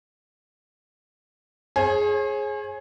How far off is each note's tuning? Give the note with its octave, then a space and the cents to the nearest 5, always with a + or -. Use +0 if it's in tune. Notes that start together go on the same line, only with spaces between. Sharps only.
G#4 +10 C#5 -45